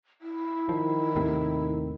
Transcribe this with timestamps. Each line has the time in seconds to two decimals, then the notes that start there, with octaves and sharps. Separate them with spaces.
0.21 E4
0.69 D#3 F3
1.15 D#2 A2 C3